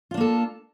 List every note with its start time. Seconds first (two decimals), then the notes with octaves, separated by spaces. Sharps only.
0.11 F4
0.14 D4
0.17 A#3
0.21 A4